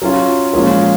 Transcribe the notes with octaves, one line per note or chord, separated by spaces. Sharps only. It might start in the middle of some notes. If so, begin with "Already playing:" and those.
F#3 C#4 F4
A#2 F3 G#3 C#4